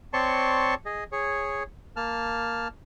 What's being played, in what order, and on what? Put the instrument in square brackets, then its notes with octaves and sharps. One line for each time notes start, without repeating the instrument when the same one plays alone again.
[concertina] C4 C#5 D5 A5 C6 C#6
G#4 D#5
G#4 C#5
A#3 A5 F6